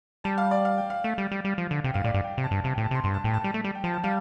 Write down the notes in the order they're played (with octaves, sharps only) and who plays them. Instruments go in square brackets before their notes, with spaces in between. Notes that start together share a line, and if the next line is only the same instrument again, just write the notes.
[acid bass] G3 [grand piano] A5
[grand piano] F5
D5
F5
G5
F5
[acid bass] A3
G3
G3
G3
F3
D3
[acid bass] C3 [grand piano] G5
[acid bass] G2 [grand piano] F5
[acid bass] A2 [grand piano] D5
[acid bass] G2 [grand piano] F5
[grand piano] G5
[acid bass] C3
[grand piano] A5
[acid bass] G2
[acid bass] C3 [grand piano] A5
[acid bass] A2 [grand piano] G5
[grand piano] A5
[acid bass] C3 [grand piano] C6
[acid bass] G2 [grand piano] C6
[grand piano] A5
[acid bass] A2 [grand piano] G5
[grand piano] A5
[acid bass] G3
A3
G3
[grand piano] G5
[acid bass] F3 [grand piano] A5
[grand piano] A5
[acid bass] G3 [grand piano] F5